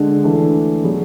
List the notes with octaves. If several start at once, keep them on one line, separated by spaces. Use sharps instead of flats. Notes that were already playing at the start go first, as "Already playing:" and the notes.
Already playing: D3 G#3 D4
E3 A3 D4
F#3 B3 D4 G#4